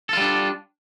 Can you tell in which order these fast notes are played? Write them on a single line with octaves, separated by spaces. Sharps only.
A4 F4 G3 D4